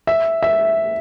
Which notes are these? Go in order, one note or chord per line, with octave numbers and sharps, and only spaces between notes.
E5
E5